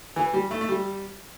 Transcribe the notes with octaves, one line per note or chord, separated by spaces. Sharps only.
E3
G3
A3
A3
G3